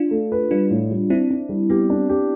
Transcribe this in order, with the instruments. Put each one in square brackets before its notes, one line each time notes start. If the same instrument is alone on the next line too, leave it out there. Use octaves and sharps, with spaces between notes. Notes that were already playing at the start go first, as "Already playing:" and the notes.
Already playing: [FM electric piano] D4 F4
[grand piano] A3
B4
[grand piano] G3 [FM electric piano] D4 F4
[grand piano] A2
G3
[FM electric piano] C4 E4 [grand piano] D4
[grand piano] D4
G3
[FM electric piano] B3 [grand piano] G4
[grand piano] D4
G4